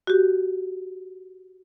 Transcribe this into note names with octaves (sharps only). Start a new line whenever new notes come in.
F#4 G4